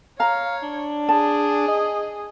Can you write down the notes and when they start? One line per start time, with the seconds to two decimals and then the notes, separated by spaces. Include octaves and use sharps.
0.20 C#5 F5 A#5
0.63 D4
1.09 G#4 A5
1.68 D#5